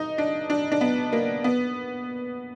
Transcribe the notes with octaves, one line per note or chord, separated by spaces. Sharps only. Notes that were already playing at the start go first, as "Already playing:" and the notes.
Already playing: D#4
D4
D4
D4
B3
A#3
B3